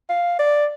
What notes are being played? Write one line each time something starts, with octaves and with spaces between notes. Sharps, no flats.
F5
D5